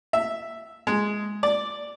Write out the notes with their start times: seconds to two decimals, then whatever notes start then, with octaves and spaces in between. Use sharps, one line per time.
0.13 E5
0.87 G#3
1.43 D5